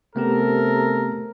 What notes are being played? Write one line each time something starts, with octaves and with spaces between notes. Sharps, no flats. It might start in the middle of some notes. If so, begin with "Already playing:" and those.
C3 A3 B3 G4 A4 A#4